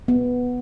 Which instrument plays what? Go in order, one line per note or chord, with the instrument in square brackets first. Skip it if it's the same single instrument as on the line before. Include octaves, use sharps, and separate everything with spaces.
[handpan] B3